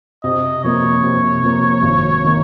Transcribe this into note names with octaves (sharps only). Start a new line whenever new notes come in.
C3 D#5
F3 A#3 C#5
C3
F3 A#3
G#1
D#3 A#3